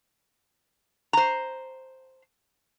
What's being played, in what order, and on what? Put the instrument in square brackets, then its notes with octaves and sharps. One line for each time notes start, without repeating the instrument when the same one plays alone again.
[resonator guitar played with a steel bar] C5 A#5